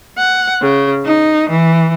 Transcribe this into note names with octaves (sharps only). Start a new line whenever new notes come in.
F#5
C#3
D#4
E3